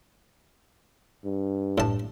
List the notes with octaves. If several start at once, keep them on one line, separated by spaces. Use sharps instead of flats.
G2
A2 A5